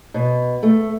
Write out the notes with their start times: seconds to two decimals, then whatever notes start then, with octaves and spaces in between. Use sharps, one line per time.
0.14 B2
0.63 A3